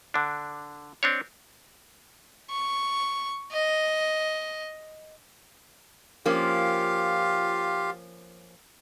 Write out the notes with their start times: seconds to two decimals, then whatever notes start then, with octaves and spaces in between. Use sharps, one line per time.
0.14 D3 D4
1.03 C4 D4 C#5
2.50 C#6
3.52 D#5
6.26 F3 A#3 C#4 F4 G4 F5